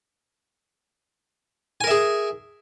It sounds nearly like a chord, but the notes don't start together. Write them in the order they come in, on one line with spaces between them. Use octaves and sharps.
G#5 A#4 E5 G#4